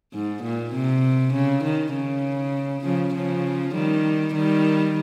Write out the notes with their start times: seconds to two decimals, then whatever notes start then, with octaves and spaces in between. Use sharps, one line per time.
0.14 G#2
0.43 A#2
0.74 C3
1.33 C#3
1.64 D#3
1.94 C#3
2.84 C#3 F3
3.14 C#3 F3
3.75 D#3 G3
4.34 D#3 G3